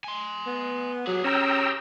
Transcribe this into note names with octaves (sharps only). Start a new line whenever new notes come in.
G#5 C6
B3
F#3 G4 G#4
C#4 G5 A#5 E6